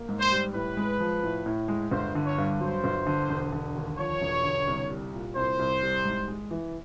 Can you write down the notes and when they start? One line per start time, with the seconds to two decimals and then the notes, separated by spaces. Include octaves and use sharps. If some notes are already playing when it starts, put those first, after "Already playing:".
Already playing: A#3
0.09 G#2
0.20 C5
0.32 G3
0.54 A2 B4
0.77 G#3
1.00 F3
1.23 A2
1.46 A2
1.68 G#3
1.91 G1 C5
2.15 D3
2.26 C#5
2.38 G2
2.60 F#3 C5
2.84 G1
3.07 D3
3.30 E1
3.53 D3
3.76 D#2
3.98 F3 C#5
4.22 E1
4.44 D3
4.67 C2
4.90 G3
5.13 A#2
5.36 C2 C5
5.59 C2
5.82 G3
6.05 G#2
6.28 G#3
6.51 E3